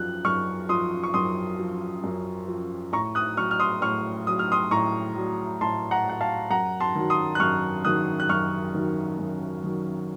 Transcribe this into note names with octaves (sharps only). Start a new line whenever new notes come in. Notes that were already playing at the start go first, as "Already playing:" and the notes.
Already playing: F#2 F3 F#6
F#2 C#6 F6
F3 C6 D#6
C#6
F#2 C6 D#6
F3
F#2
F3
A2 A#5 C#6
D#6 F#6
F#3 C#6 F6
F6
C6 D#6
A2 C#6 F6
F#3 D#6
F6
C6 D#6
A2 A#5 C#6
F#3
A2 A5 C6
F#5 A#5
F#3 F#5
F5 A5
F#2 F#5 A#5
A5 C6
D#3 F#3
C6 D#6
F#6
F#2 C#6 F6
D#3 F#3 D#6 F#6
F#6
F#2 C#6 F6
D#3 F#3
F#2
D#3 F#3